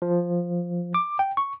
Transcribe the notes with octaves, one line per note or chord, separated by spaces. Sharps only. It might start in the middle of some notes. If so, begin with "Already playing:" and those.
F3
D6
G5
C#6